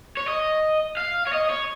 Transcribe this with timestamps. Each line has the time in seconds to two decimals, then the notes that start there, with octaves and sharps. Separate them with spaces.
0.17 C#5
0.28 D#5
0.97 F5
1.27 C#5
1.33 D#5
1.50 C#5